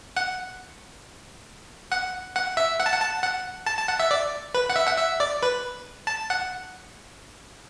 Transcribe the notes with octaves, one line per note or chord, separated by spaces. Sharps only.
F#5
F#5
F#5
E5
F#5
A5
F#5
A5
F#5
A5
A5
F#5
E5
D5
B4
F#5
E5
F#5
E5
D5
B4
A5
F#5